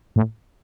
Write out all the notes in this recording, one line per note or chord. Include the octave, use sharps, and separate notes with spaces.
A2